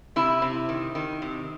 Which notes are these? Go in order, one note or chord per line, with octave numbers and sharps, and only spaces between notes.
C3 E4
C3
D#3
D#3
C3